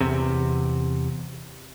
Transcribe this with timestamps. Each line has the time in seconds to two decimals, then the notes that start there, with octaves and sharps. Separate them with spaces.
0.01 E2 C3